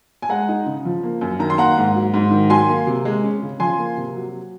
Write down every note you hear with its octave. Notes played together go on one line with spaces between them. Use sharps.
G#5
G#3 F#5 A#5
D#4
C#3
F3
A#3
F#2
D#3 A#5
C6
A#3 F#5 A#5
G#2
F#3
G#2
D#3
F#3 G#5 C6
A#3
C3
G#3
C#4
C#3
F3 G#5 C6
A#3
C3
F#3